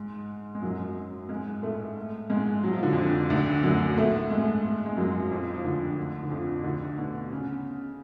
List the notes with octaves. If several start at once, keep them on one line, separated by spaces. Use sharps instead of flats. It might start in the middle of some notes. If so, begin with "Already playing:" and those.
Already playing: G#2 G#3
G#3
F#2 F#3
G#2 G#3
A2 A3
G#2 G#3
F#3
F3
D3
F2 F3
D2 D3
F#2 F#3
A2 A3
G#2 G#3
G#3
F#2 F#3
F2 F3
F3
D2 D3
D3
F2 F3
D2 D3
B2
C#3